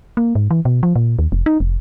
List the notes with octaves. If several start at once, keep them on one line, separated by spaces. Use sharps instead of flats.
A#3
G#2
E3
B2
F3
A#2
D#2
F1
D#4
F1